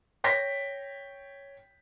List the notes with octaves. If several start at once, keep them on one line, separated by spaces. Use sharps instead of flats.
C#5 G5 A#6 B6